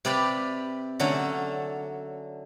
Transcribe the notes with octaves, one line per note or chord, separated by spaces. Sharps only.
C3 G4 B4 D5 F5 G5
D3 F#3 A3 C#4